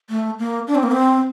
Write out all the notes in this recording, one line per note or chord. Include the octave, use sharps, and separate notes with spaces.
A3
A#3
D4
C4
A#3
C4